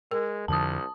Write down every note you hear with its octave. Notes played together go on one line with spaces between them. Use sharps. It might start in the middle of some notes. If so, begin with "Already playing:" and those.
G#3 A#4
C2 F2 D3 F3 A5 D#6